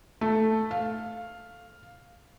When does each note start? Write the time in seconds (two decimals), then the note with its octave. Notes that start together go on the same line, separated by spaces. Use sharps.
0.21 A3
0.71 F5